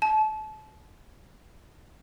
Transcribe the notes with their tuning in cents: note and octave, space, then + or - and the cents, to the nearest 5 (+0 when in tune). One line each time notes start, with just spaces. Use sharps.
A5 -30